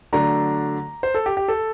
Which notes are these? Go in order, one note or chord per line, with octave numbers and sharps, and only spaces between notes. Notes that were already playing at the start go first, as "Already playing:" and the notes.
D3 F#3 A3 D4 A#5
C5
A4
G4
G4
A4